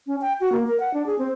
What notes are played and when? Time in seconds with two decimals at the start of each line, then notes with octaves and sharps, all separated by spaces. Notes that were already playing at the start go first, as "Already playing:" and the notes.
0.07 C#4
0.21 G5
0.41 F#4
0.52 A#3
0.67 A#4
0.80 F#5
0.94 D4
1.06 G#4
1.19 C4